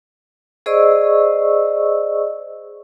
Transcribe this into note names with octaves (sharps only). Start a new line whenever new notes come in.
G#4 C5 D5 D#5 C#6 E6